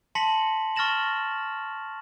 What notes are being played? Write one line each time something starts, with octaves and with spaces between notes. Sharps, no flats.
A5 C6 A#6 B6 C#7 F#7
C#6 F6 A6 A#6 E7 F#7